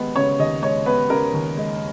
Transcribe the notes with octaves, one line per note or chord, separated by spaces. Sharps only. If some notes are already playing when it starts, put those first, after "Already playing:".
Already playing: D#2 G#3 B3
C#3 C#5
D#2 D#5
G#3 C#5
B3 B4
C#3 A#4
D#2
G#3